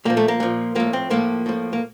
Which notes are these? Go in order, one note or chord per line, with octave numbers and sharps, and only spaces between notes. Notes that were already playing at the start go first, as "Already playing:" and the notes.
A#2 F3 A#3
A3
A#3
A#2 F3
A2 F3 A#3
C4
A2 F3 A#3
A2 F3
A#3